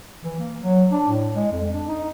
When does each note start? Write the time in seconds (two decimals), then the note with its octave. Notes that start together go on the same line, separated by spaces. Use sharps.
0.23 E3
0.39 A#3
0.61 F#3
0.91 D4
1.08 A2
1.34 G#3
1.52 F2
1.73 D4
1.88 D#4